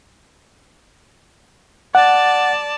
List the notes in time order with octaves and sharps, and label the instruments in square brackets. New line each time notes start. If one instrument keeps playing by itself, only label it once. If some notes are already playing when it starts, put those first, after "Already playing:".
[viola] D5 A5 [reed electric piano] F#5